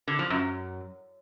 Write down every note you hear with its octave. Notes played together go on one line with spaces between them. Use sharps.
D3
F3
F#2